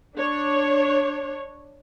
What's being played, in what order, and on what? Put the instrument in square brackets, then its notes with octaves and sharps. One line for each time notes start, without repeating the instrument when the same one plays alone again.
[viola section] D4 C#5